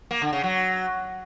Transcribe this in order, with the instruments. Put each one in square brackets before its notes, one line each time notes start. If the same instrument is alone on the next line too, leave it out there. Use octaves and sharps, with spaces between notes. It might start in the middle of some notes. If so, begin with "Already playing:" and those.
[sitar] A#3
D3
C#3
F#3